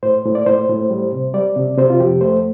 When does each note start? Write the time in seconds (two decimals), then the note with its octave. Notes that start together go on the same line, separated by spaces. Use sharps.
0.03 A2 C5
0.25 A2
0.35 D5
0.46 A2 C5
0.69 A2
0.90 G3
1.13 C3
1.34 G3 D5
1.56 C3
1.78 C3 C5
1.90 F4
2.00 F2 G4
2.21 A3 C5